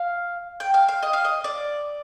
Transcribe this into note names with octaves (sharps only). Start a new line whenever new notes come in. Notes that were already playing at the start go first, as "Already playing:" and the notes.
Already playing: F5
G5
F5
F5
D#5
F5
D#5
D5